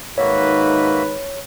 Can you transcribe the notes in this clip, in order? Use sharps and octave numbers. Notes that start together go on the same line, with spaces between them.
G#2 D#3 A#3 D#4 F#4 B4 C#5 E5